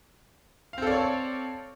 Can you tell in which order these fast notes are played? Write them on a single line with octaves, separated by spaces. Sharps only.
F5 C4 A4 D5 C#5